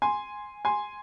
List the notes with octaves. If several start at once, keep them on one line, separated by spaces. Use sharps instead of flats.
G#5 C6
G#5 C6